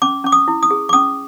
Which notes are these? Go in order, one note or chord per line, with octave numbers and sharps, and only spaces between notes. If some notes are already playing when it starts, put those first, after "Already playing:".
C#4 D6
C#4 D6
D#6
E4
D#6
G#4
D6
C#4 D#6